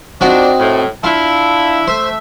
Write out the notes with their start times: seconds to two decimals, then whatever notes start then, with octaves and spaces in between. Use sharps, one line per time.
0.21 F3 C4 D4 D#4 F#4
0.59 A2
1.04 D4 E4 F4
1.87 A3 C5 E5